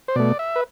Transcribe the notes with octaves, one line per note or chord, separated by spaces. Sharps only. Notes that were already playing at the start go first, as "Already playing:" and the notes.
C5
B2 A3 D5
E5
B4